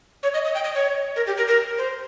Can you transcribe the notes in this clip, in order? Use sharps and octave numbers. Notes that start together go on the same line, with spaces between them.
C#5
D#5
D#5
G5
D#5
C#5
A#4
G4
A#4
A#4
C5